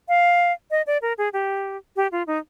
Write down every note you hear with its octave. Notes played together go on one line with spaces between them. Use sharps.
F5
D#5
D5
A#4
G#4
G4
G4
F4
D#4